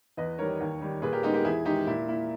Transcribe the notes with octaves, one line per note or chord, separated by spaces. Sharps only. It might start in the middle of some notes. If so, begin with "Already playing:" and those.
E2 B4 D#5
D#3 G3 A#4 C#5
D#2
D#3 G3
A#2 G#4 B4
G4 A#4
G#3 B3 D#4 G4
G4 A#4
E2 E4 G#4
D#3 G#3 D#4 G4
A#2 E4
A#3 E4